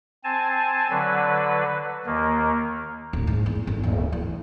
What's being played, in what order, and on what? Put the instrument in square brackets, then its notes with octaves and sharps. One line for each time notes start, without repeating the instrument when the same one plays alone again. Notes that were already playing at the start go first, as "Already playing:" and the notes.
[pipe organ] C4 G#5 A5
D3 F#3 B4
D#2 D#3 A#3
[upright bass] D1
G#2
E2
G1
D1
E3